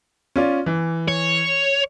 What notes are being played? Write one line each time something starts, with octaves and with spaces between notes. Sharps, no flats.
C#4 F4 D5
E3
C#5